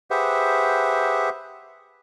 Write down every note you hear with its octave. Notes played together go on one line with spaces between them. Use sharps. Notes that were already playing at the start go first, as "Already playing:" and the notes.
G4 G#4 B4 C5 E5 F#5